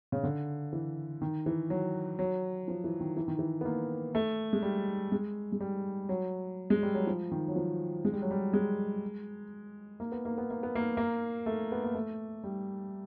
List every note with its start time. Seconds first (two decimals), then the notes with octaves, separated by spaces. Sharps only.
0.12 C#3
0.23 D3
0.73 E3
1.21 D#3
1.46 E3
1.70 F#3
2.19 F#3
2.68 F3
2.84 E3
3.00 D#3
3.17 E3
3.28 D#3
3.39 E3
3.61 B3
3.65 A#3
4.15 A3
4.53 G#3
4.63 G3
5.12 G#3
5.52 G#3
5.60 G3
6.09 F#3
6.70 G#3
6.83 G3
6.95 F#3
7.07 F3
7.32 D#3
7.48 F#3
7.56 F3
8.05 G#3
8.13 G3
8.22 F#3
8.31 G3
8.53 G#3
10.00 A#3
10.12 B3
10.25 A#3
10.38 B3
10.50 A#3
10.63 B3
10.75 A#3
10.97 A#3
11.46 A3
11.72 B3
11.84 A#3
11.94 A3
12.44 G3